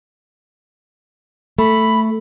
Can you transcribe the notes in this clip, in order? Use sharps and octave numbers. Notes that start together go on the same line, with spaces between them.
A3 B5